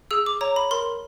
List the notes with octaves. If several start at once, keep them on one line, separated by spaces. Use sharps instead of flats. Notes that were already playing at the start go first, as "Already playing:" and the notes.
G#4 E6
D6
C#5 A#5
B5
A#4 C6